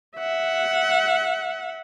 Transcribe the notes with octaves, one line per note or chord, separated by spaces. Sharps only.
E5 F#5